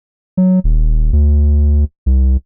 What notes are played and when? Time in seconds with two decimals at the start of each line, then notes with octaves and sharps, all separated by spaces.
0.37 F#3
0.64 D#1
1.13 D2
2.06 C2